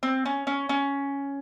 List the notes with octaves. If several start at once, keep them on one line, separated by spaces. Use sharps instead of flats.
C4
C#4
C#4
C#4